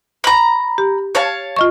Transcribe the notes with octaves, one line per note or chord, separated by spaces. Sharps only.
A#5 B5
G4
C#5 F5 A5
F4 D#5 C#6